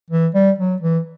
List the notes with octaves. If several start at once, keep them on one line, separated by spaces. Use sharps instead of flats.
E3
G3
F#3
E3